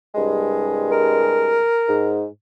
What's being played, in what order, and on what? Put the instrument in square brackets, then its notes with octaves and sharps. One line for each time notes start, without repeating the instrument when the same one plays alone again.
[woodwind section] C2 G2 G#3
[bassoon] A#4
[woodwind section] G#2